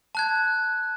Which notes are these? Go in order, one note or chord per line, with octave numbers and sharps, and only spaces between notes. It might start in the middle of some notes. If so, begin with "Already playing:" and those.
A5 F#6 G#6